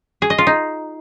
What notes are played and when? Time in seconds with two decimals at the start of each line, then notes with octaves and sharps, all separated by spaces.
0.22 G#4
0.30 D#5
0.38 F4
0.47 D#4